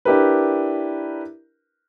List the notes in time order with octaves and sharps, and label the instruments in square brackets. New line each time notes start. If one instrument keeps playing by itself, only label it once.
[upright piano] D4 E4 G4 A#4 B4